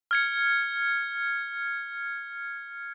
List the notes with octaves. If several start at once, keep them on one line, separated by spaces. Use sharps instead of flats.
F6 G#6 C#7